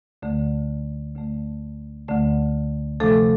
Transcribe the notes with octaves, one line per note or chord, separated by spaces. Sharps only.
D2 D3 A3
D2 D3 A3
D2 D3 A3
C3 F3 A3 D4 A4